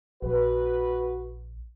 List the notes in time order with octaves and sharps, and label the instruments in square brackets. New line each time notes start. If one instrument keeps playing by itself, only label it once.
[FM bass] A#1 [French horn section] F#4 B4